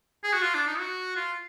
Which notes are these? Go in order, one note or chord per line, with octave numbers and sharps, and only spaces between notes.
G#4
F#4
F4
D4
D#4
F#4
F4